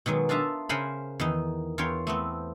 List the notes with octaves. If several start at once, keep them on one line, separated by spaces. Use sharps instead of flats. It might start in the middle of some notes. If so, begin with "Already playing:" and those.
B2 D#3 F#3 G#3
D4 F4 D#5 E5 A5 A#5
C#3 A#4 C5 F#5 G#5 B5
E2 D#3 D#4
E2 F4 A#4 C#5 G5
A3 B3 C4